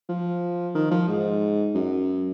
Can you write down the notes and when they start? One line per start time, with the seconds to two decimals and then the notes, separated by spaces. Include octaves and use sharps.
0.09 F3
0.75 D#3
0.91 F3
1.08 G#2
1.75 F#2